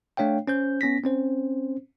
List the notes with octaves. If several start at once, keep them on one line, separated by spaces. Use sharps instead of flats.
A3 D4 C#5 F5 G5
C#4 C5 G6
B3 C#4 A#6 B6
C4 C#4 C5